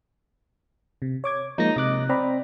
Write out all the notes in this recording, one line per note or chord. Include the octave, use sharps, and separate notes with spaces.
C3
C#5 D6 G#6
F3 G#3 A#3 D#4 A#6
C3 D#5 D6 F#6
C4 D5 A#5 B5